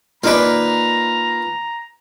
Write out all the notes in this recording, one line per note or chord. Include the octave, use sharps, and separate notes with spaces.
A#3 D#4 F4 B4 D5 A#5